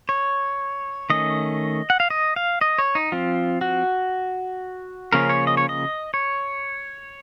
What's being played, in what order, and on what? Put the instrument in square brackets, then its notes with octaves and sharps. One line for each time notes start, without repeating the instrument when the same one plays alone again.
[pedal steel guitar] C#5
D#3 A3 C#4 D#5
F#5
F5
D#5
F5
D#5
C#5
D#4
F3 C4 F4
F#4
C#3 F3 A#3 C#4 A#4
C#5
D#5
C#5
D#5
C#5